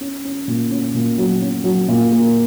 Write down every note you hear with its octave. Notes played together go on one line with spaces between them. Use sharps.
C#4
C#4
A#2
C#4
A#2
F#3
C#4
F#3
A#2
A#3